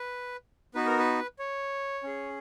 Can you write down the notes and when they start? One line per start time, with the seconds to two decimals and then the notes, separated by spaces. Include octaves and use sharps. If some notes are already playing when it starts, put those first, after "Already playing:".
Already playing: B4
0.75 B3 D#4 F#4 B4
0.86 A#4
0.99 B4
1.39 C#5
2.03 C#4 G#4